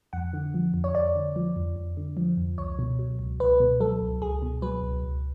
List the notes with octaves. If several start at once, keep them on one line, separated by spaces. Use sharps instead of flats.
F2 F#5
D3
F3
F2
C#5
F2 D5
D3
F3
F2
F2
D3
F3
F2
C#2 C#5
B2
F#3
C#2
C#2 B4
B2
F#3 A4
C#2
C#2 G#4
B2
F#3 B4
C#2
C#2